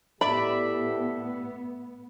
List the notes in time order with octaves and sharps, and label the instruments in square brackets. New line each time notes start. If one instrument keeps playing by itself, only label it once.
[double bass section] A2 B3 [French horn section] E4 G4 A4 [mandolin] D5 E5 [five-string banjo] B5